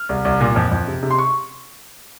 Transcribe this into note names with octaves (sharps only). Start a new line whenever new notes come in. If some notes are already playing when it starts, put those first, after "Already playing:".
Already playing: F6
C2
C2
A#2
F2
F2
C3
C3
C6
C#6